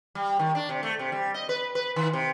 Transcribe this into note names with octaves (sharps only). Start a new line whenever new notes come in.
G3
D#3
D4
C3
A3
C3
G3
D#5
B4
B4
D#3
C3